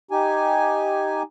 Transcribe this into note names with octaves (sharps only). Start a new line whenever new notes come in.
D#4 G4 G#5